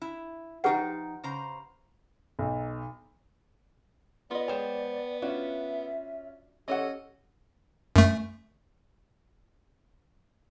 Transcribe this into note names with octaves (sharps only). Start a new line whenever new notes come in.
E4
F3 D#4 G4 B4 F#5 G5
C#3 C5 A#5
B1
B3 F4 D5 D#5
G#3 C5 C#5 G5
C#4 D4 F4 F#4 E5
E3 C#4 G4 A4 C#5 D#5 F#5
F#2 A3